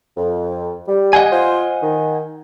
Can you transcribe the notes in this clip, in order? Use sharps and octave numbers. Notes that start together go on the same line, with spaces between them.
F2
G3
D#5 F#5 G#5
F4 C5
D#3